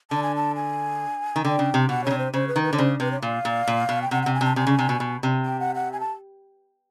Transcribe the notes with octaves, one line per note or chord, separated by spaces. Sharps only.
D3 A5
G#5
A5
G#5
D#3
D3 G5
C#3
C3
B2 F#5
C#3 C#5
C3
C5
C#3 C5
B4
D#3
B4
D3 C#5
C#3 C5
C3 B4
C#5
A#2 F5
A#2
A#2
B2
G5
C3 F#5
C3 F#5
G#5
C3 A5
C3 G#5
C#3
C3
B2
B2
C3
G5
F#5
F#5
G#5
A5